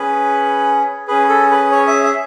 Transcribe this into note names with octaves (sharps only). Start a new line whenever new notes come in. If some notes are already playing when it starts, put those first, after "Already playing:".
Already playing: C#4 G#4 B4
C#4 G#4 B4
A4
B4
C#5
E5
E5